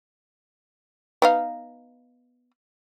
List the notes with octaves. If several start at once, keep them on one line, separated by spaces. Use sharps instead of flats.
B3 D#4 F5